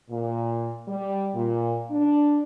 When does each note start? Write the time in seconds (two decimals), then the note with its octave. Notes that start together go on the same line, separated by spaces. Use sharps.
0.10 A#2
0.88 G3
1.34 A#2
1.91 D4